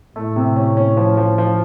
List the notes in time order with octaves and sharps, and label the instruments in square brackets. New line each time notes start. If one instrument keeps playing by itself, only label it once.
[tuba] A2 [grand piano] A3
[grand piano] C3
C#4
C#4
F3
F3
F3